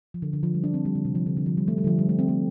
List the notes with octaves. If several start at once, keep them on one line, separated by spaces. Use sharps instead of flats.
F3
D3
D3
F3
G3
D4
C4
G3
D3
C3
F3
D3
D3
F3
G3
A3
G3
D3
F3
G3
A3
C4
A3